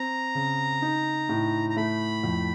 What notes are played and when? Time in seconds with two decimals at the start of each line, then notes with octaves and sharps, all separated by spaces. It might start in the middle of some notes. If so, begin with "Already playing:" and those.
Already playing: C4 A#5
0.35 C#3
0.82 D#4
1.29 A2
1.70 A#5
1.77 A3 B5
2.24 F2